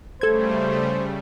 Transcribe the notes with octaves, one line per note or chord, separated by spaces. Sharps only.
C#3 G3 A3 A4 C5 G#6